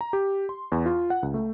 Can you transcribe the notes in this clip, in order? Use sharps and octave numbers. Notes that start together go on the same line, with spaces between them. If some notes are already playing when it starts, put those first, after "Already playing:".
A#5
G4
C6
E2
F4
F#5
C#2
A3